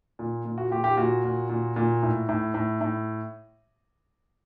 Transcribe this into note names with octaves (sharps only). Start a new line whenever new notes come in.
A#2
A#2
F#4
A#2 G4
G4
A#2 F#4
A#2
A#2
A#2
A2
A2
A2
A2